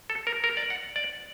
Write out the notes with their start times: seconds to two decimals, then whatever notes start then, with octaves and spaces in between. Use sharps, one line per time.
0.10 A4
0.27 A#4
0.44 A#4
0.57 D5
0.70 F#5
0.96 D5